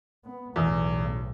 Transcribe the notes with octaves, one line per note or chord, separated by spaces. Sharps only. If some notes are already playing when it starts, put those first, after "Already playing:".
B3
B1 E2 A2